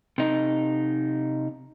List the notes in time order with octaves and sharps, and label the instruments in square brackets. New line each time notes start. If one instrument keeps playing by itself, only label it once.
[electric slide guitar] C3 D#4